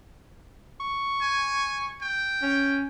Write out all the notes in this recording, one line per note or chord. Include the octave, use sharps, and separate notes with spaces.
C#6
G#5
G5
C#4